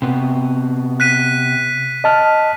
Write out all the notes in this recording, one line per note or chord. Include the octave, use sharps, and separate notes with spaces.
C3 B3
F#6 B6 D#7
D#5 A5 F6